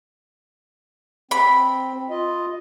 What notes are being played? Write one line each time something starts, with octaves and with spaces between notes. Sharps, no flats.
C4 B5
F4 D#5